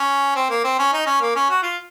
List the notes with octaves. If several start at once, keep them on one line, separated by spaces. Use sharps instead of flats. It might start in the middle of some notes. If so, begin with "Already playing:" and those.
Already playing: C#4
C4
A#3
C4
C#4
D#4
C#4
A#3
C#4
F#4
F4